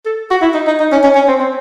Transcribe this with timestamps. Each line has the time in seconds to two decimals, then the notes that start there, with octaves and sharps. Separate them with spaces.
0.06 A4
0.31 F#4
0.42 E4
0.54 D#4
0.67 D#4
0.80 D#4
0.92 C#4
1.03 C#4
1.15 C#4
1.28 C4
1.40 C4